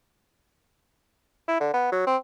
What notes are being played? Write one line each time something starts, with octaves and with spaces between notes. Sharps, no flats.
E4
D3
B3
F#3
C4